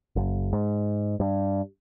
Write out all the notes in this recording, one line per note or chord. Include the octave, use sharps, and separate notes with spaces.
F#1
G#2
G2